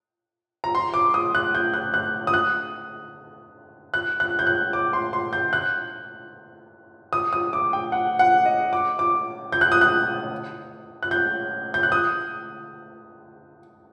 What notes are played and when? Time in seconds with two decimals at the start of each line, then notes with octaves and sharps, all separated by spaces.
0.64 A#5
0.75 C6
0.94 D6
1.14 D#6
1.35 F#6
1.55 G6
1.74 F#6
1.94 F#6
2.27 D#6
2.34 F#6
3.94 F#6
4.20 F#6
4.39 G6
4.47 F#6
4.73 D6
4.93 C6
5.13 C6
5.33 G6
5.53 F#6
7.13 D#6
7.33 D#6
7.53 D6
7.73 G5
7.92 F#5
8.19 F#5
8.46 D#5
8.73 D6
8.99 D6
9.52 G6
9.61 F#6
9.72 D#6
9.81 F#6
11.03 F#6
11.11 G6
11.74 G6
11.83 F#6
11.92 D#6